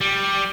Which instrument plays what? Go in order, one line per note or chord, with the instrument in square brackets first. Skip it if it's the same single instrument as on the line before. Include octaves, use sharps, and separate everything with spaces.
[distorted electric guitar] G3